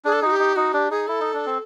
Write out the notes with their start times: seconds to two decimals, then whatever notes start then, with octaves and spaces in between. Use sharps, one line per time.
0.05 D4 G#4
0.13 A4
0.22 D#4 F#4 G#4
0.31 G4
0.39 D#4
0.56 D#4 F#4
0.73 D4 G4
0.91 D#4 G#4
1.08 E4 A4
1.20 D#4
1.34 D4
1.46 C4